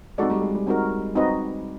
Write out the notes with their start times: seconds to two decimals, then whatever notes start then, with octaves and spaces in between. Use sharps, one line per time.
0.18 G#3 C4 D#4 F#4 A4 D5
0.30 G3
0.42 G#3
0.54 G3
0.67 C4 D#4 F#4 A#4
1.16 C4 D#4 F#4 B4 D#5